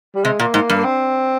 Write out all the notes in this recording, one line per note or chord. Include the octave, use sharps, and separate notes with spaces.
G3
C3 G#3
A#2 A#3
G#2
G2
A#3
C4